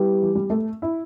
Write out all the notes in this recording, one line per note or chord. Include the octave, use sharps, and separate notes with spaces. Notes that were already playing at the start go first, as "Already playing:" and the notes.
Already playing: G3 B3 E4 G4 B4
E3
G3
A3
E4